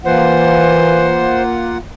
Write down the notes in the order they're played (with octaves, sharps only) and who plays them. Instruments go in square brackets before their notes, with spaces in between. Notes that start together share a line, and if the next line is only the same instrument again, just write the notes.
[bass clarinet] E3 [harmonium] A#3 F4 F#5 [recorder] C5